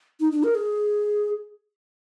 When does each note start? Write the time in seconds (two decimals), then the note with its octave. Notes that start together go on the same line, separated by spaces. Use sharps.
0.20 D#4
0.32 D4
0.43 A#4
0.55 G#4